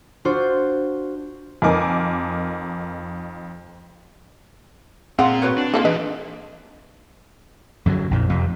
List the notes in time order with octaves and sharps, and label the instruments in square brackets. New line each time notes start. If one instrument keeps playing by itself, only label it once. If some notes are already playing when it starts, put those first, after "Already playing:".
[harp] D4 F4 F#4 C5
[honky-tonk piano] F2 D#4 A#4 G#5 D6
[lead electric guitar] A#2 A#5 [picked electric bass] C4 [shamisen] F4 [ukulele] G#4 D5 F#5
[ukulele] F#4 B4 C#5
[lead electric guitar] D4
[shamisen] C#3 F4 A4 [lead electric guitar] A#3 [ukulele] D#4
[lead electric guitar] E3 D4 [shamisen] G#3 B4 D#5
[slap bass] F#2 D3 E3 F#3
A#1 F2 A#2
F2 C3